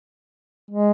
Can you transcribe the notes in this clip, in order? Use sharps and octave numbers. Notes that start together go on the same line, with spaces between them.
G#3